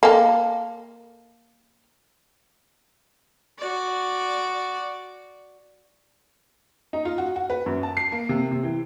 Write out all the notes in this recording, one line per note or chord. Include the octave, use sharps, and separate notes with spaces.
A#3 A4
F#4 D5
D#4
F4
F#4
F#4
B4
F#2
A5
C7
A#3
C3
C3
E3